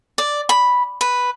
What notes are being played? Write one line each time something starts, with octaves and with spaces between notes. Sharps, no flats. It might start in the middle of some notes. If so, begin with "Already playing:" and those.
D5
B5
B4